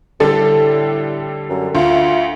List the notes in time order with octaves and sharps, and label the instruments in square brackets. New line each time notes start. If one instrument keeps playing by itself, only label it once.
[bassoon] A2 [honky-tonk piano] D3 G3 A4
[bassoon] F#2
[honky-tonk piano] D2 [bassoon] F4